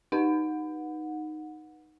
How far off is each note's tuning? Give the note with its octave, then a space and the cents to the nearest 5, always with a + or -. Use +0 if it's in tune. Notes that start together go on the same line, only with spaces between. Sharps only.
D#4 -5 B4 -20 F#5 -20